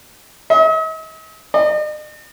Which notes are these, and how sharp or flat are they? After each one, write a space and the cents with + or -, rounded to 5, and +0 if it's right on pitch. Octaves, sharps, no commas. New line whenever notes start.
D#5 +45
D#5 -45